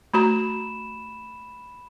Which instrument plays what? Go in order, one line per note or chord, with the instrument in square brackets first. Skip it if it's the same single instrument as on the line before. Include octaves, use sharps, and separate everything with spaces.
[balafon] A3 F#4 A#5 [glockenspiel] B5 E7